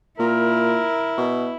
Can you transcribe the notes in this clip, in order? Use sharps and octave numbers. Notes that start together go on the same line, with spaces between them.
A#2 E4 A#4
B2